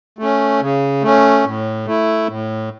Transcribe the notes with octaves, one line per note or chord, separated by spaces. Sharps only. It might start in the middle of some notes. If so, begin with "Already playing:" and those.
A3 C#4
C#3
A3 C#4
A2
A3 E4
A2